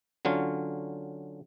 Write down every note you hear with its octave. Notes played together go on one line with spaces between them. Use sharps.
D3 F#3 C#4 F4